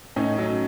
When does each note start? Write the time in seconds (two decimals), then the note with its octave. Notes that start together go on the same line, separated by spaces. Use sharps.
0.16 A2 C#4 D#4
0.38 F#3